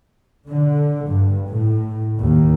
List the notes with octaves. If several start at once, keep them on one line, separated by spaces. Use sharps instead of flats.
D3
G2
A2
D#2